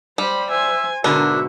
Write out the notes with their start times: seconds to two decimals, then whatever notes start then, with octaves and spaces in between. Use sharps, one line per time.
0.18 G3 C5 B5
0.50 C5 E5 G#5
1.04 G#2 B2 D3 D4 F#4 A#4 E5